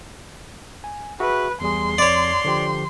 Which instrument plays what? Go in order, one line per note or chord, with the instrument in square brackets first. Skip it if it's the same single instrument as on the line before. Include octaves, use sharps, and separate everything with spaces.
[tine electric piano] G#5
[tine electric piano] F#4 G#4 E5 [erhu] B4
[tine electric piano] E2 G3 G#4 [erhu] C6
[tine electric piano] F2 [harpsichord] C#5 D5
[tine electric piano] D3 F3 G4